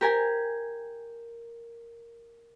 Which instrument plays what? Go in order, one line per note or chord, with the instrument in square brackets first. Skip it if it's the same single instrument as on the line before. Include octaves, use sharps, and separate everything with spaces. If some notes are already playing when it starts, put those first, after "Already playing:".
[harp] G4 A#4 G#5